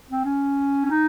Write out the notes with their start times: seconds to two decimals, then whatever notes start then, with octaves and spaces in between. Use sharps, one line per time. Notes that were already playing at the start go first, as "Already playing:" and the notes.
0.11 C4
0.25 C#4
0.85 C#4
0.91 D#4